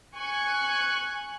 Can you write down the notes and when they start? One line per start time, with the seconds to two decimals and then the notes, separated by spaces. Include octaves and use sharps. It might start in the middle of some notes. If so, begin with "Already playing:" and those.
0.15 G#5 C#6 F#6